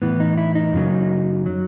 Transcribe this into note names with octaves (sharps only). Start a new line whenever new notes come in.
A2 E3 B3
D#4
E4
D#4
F#2 C#3 F#3
F#3